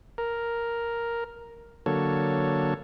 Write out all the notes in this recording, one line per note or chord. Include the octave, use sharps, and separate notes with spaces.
A#4
D3 F#3 A#3 A4 C#5